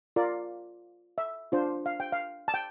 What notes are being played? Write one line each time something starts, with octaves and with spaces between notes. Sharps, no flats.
F4 A#4 D5
E5
D4 F4 C5
F5
G5
F5
A5
G5